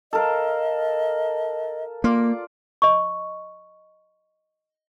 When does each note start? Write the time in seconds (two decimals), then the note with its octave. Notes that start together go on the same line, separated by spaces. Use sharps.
0.13 A4 A#4 D#5 F5
2.04 A#3 F4 D5
2.82 D#5 C#6